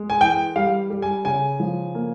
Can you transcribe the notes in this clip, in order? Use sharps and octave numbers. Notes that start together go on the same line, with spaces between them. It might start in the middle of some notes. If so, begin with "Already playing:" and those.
Already playing: G#3
G#5
E3 G5
G3 F5
G3
G#5
C#3 G#5
F3
A#3